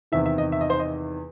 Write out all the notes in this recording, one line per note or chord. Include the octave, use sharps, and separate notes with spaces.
E2 C3 D#3 E5
E5
D#5
E5
D#5
C5
D#5